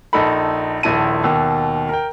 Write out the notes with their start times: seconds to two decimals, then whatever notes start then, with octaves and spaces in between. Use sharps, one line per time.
0.13 A#1 D#4 A4 B5
0.83 D#1 A#1 E4 A5 D#7
1.24 D#2 B2 E6
1.89 A#4 G5